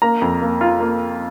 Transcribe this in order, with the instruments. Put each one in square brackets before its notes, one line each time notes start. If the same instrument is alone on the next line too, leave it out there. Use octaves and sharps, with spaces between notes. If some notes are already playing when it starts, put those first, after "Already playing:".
[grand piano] A#3 A#5
F2
A#3
F4
A#3